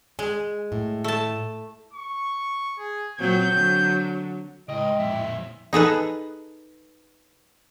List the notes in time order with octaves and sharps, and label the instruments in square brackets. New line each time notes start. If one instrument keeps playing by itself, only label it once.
[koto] G#3 [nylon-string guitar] G#5
[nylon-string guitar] A2
[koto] A3 A5
[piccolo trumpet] C#6
G#4
[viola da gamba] A#2 F#3 C4 [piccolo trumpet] G6
[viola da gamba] D3 F#3
[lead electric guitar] C#2 [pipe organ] A2 G#3 G5 [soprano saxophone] D#5
[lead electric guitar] F2 A#2 [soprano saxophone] E5
[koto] D#4 G#4 A4 B4